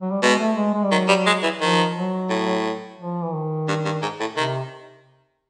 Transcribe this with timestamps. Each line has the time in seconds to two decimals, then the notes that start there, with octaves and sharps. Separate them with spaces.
0.02 F#3
0.11 G3
0.22 B2 G#3
0.39 A3
0.57 G#3
0.74 G#3
0.84 G3
0.92 D#3 F#3
1.08 G3
1.26 G#3
1.43 E3
1.61 D#3 F3
1.96 F#3
2.30 A2
2.99 F3
3.24 E3
3.34 D#3
3.68 G2
3.85 G2
4.02 G#2
4.20 A2
4.37 C3 D#3